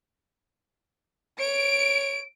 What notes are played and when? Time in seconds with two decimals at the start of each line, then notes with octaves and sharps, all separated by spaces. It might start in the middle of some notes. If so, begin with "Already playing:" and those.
1.40 C#5 D7